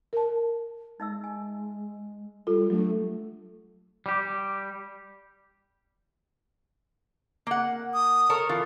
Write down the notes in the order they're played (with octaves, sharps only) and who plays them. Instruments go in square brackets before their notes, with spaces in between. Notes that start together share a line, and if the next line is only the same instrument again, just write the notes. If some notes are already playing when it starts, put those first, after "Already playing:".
[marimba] A#4 A5
[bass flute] G#3 [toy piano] D#4 E5 E6
[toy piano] G#5
[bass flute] G3 [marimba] F4 [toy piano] A4
[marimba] F#3 D4 [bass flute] A3
[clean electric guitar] G3 G4
[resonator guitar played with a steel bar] A#3 F#5
[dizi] D#6
[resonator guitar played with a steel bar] A4 A#4 C#5
E3 F4